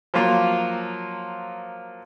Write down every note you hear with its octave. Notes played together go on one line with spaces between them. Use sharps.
F3 F#3 A#3 F4